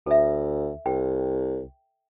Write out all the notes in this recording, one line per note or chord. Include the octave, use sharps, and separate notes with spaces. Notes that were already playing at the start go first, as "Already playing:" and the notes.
D2 A4 E5
C2 G5